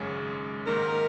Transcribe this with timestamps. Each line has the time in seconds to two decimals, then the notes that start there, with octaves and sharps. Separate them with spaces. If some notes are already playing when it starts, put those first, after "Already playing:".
Already playing: G#1 F#2 C#3 G#3 C#4
0.67 G#2 D#3 A#3 D#4 A#4